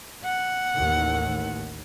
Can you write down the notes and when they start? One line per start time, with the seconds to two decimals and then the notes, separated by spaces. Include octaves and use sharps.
0.24 F#5
0.76 A1 D#2